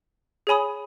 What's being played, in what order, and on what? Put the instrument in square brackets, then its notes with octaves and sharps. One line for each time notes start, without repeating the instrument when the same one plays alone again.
[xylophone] G#4 C#5 G#5 B5 D#6